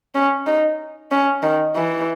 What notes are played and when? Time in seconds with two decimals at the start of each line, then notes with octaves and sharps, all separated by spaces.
0.15 C#4
0.47 D#4
1.11 C#4
1.43 D#3
1.76 E3